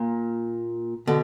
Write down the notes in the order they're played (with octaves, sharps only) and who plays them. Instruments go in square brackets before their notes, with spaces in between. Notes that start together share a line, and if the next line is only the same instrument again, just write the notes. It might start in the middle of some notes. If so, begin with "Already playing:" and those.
Already playing: [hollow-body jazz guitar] A#2
[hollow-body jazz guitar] B2 [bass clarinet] D3